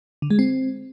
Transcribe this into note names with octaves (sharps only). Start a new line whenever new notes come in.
D3
G#3
C4